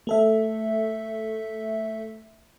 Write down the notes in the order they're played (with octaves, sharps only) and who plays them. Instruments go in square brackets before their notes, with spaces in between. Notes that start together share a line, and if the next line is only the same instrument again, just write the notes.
[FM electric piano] A3 A4 E5